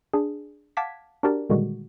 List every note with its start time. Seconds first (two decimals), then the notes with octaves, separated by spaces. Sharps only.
0.14 D4 G#4
0.77 F5 F#5 A5 D6 G#6 B6
1.23 D4 F#4 G4 A#4 D5
1.49 A#2 D3 D#3 G3 G#3 F#4